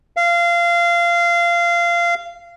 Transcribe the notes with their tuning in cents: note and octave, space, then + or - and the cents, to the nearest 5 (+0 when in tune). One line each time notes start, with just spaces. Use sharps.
F5 -20